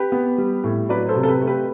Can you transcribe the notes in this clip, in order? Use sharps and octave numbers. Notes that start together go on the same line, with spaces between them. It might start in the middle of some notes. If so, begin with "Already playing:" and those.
Already playing: G4 B4
B3
G3
A2
F#3 B4 D5
A4 C5
C3
A4
G4 B4
A3
G4 B4